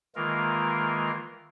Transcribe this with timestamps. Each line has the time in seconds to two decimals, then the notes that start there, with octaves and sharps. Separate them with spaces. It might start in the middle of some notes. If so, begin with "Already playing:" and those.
0.16 D#3 E3 G#3 A#3 F4 A#4